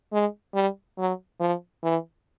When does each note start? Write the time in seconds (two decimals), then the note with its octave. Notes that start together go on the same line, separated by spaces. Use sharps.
0.13 G#3
0.54 G3
0.99 F#3
1.40 F3
1.84 E3